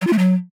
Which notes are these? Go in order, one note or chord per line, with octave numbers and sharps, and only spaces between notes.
F#3
F4
A3
F#3